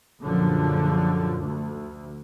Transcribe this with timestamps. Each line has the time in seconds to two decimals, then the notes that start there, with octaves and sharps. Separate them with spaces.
0.20 A#1 F#2 D3 F3
1.36 D2